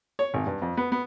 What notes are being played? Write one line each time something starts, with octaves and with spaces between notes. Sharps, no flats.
C#5
G#1
G2
F2
B3
B3